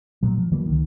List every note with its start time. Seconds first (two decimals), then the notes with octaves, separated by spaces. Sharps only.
0.23 A#2 F#3
0.38 F3
0.51 D3 E3 F#3 A#3
0.66 C#2 D#3